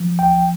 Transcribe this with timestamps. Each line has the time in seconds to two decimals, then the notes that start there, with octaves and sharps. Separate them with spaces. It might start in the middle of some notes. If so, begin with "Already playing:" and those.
Already playing: F3
0.19 D2 G5